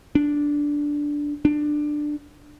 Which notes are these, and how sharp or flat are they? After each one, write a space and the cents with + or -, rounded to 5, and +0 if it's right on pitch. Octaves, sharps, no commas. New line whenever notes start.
D4 -5
D4 +15